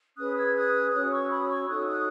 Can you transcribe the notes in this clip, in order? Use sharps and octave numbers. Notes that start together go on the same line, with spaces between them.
C#4 G#4 B4 D#6 F#6
E6 G#6
D#6 F#6
C#4 F#4 C#5 D#6 F#6
C#6 E6
B5 D#6
C#6 E6
D#4 F#4 A4 C#5 D#6 F#6
D#6 F#6